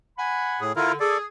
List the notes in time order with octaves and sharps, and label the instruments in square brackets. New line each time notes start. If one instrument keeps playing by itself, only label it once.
[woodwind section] F#5 G#5 B5
[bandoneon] A2 G#4
[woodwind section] D3 [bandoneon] E4 F4 A#4
[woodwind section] G#4 [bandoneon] A4 D5